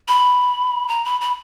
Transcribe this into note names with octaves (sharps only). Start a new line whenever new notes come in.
B5
A#5
B5
B5